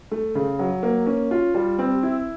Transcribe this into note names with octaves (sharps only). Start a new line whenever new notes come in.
A3
C#3
F#3
A#3
C#4
F4
G3
C4
E4